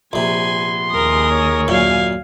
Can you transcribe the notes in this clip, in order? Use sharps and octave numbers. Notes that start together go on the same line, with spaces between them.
A#1 C3 B3 G#5 C6
D#2 G#4 A#4 D#6
C#5
F#2 A#2 F5 G#5